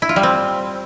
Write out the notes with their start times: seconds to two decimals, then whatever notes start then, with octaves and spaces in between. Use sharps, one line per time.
0.02 E4
0.09 F4
0.16 G3
0.23 C4